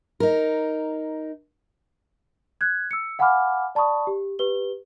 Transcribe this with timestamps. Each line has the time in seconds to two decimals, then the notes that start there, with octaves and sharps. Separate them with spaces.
0.20 D#4 A#4
2.61 F#6 G#6
2.91 E6 C#7
3.19 F5 F#5 G#5 B5 D6 F6
3.75 D5 A5 B5 C#6 D#6
4.07 G4
4.39 G4 B4 G7